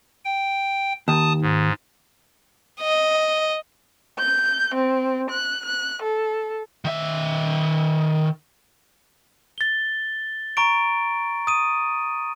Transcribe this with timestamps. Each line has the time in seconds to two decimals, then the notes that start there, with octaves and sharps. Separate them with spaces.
0.25 G5
1.08 D#2 A5 D#6
1.42 G#2
2.81 D#5
4.18 G6
4.74 C4
5.30 F#6
5.64 F#6
6.02 A4
6.85 D#3 E5
9.58 A6 G7
10.57 A#5 C#6 D7
11.47 D#6 D#7